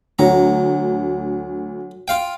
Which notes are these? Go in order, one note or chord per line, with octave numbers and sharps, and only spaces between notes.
D2 F#3 A#5
F4 F5 G5